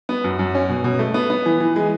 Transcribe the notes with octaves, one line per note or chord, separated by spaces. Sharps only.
B3
F#2
F#2
C#4
B2
B2
A3
B3
B3
E3
E3
G#3